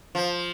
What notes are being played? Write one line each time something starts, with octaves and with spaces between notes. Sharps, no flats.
F3